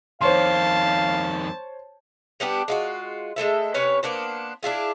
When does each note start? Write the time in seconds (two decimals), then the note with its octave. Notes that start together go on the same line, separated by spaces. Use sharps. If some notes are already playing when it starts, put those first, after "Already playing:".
0.21 F2 D#3 C5 C#5 F5 A5 C6
2.40 G3 B3 D4 G4
2.68 G#3 F4 F#4
3.36 G#3 A3 A4 E5
3.74 C3 C#4 B4 C#5
4.03 A#3 B3 D4 C5
4.63 D4 E4 F4 G#4